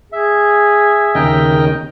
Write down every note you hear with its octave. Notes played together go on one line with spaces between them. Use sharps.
G#4 E5
D#2 C#3 A#4 D#5 G5